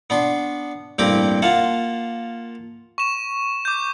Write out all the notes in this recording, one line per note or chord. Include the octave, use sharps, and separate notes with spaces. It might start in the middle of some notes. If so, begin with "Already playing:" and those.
B3 D4 C6
A1 G2 A#3 C4 G4 D6
A#3 F4 F5 F#5 A5
C#6 E7
D6 G6